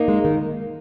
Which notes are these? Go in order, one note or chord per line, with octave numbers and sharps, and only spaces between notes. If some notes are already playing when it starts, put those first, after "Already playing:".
Already playing: A#3 D#4
G#3
D#3